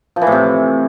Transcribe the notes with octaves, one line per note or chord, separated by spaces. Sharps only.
F3
E3
A2
C3